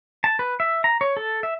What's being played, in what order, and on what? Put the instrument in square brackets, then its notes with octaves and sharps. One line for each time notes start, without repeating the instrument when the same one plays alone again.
[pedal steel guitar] A5
B4
E5
A#5
C#5
A4
E5